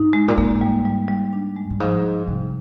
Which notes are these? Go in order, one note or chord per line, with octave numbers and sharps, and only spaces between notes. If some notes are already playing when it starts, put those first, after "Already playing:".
Already playing: G#2 D#4
G#3
A#2
G#2 A#3
G3
G3
G3
D4
G#3
G2
G#2 F3
F3
C3 G3